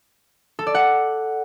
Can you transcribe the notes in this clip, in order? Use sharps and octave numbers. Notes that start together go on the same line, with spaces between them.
A4
D5
F#5